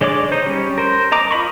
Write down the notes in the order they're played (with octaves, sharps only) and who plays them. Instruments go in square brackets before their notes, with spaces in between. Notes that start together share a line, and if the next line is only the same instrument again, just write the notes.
[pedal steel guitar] D3 G#3 C#5 D5 D6
D#4 C5
G3 C#4
A#4 C5
D#5 A#5 D6
F4 D#5 B5 C#6